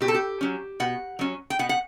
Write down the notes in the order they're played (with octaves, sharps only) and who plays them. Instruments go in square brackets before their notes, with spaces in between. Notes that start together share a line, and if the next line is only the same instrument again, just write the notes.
[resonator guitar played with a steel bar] B2 G4
A4
G4
F#3 C#4
B2 F#5
F#3 C#4
G5
B2 F#5
F#5